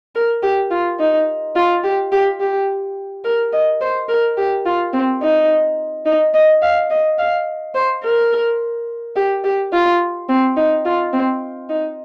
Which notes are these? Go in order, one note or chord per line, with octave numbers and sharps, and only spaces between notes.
A#4
G4
F4
D#4
F4
G4
G4
G4
A#4
D#5
C5
A#4
G4
F4
C4
D#4
D#4
D#5
F5
D#5
F5
C5
A#4
G4
G4
F4
C4
D#4
F4
C4
D#4